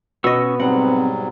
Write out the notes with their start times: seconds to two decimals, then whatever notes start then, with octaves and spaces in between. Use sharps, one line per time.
0.24 B2 B3 C#4 D#5 C#6 E6
0.60 G#2 F#3 G3 C4 F#5